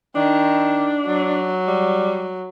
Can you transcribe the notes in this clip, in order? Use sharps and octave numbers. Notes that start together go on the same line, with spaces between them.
D#3 D4
F#3
G3